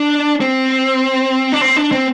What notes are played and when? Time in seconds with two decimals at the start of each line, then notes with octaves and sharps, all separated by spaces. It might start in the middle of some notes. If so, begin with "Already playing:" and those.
Already playing: D4
0.41 C4
1.52 D4
1.61 C4
1.76 D4
1.92 C4